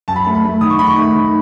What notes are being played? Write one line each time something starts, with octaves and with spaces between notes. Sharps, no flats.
F#2 A5
B5
A3 A5
B5
A3
D#3 D#6
C#6
D#3 B5
C#6
A3
D#3